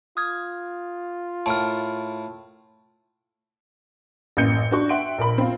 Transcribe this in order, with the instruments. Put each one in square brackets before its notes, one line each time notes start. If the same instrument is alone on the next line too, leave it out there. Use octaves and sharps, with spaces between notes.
[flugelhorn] F4 [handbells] D#6 F6 G#6
[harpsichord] A2 A#4 [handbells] A5 F6
[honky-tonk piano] A1 F#2 A#3 G6 C#7
D4 F#4 C#6
E5 F#5 G5 C6 D7
A#1 A#4 B5
C4 F4